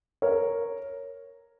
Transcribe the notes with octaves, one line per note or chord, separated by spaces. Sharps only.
A#4 C#5